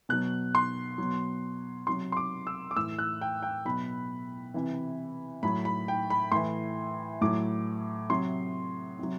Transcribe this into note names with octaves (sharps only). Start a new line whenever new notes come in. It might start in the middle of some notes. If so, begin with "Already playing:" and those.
B2 F#3 F#6
C6
B2 F#3
C3 F#3 C6
C6
D6
E6
D6
A2 E3 E6
F#6
G5
G5
B2 F#3 B5
C3 E3
A2 F#3 B5
B5
G5
B5
A2 E3 C6
A2 F#3 D6
C3 F#3 C6
C3 F#3